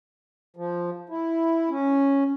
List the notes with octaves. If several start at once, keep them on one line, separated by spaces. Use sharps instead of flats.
F3
E4
C#4